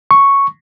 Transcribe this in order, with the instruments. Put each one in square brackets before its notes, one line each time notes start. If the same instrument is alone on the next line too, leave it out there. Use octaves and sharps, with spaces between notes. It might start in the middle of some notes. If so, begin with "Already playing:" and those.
[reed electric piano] C#6